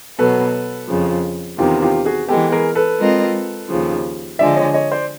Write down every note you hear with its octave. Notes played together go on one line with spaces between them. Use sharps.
B2 F#3 B3 A4 B4
F2 C#3 F3
E2 C3 D#3 F4 G4
F4 G4
F#4 G#4
E3 G#3 B3 G4 A4
G#4 A#4
A4 B4
G#3 C4 F4 A#4 D#5
D#2 C#3 F3
D3 F3 G#3 D5 E5
C#5 D#5
C#5 D#5
C5 D5